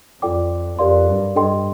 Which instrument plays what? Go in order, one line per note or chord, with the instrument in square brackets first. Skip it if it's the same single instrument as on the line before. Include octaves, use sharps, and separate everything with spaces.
[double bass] F2 [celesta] F4 A4 D5 G5 D6
[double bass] F2 [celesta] G4 A#4 D5 F5 C6
[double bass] G2
[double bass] G2 [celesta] D4 A4 D#5 G5 C6